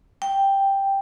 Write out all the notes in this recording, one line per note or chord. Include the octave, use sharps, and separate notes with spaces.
G5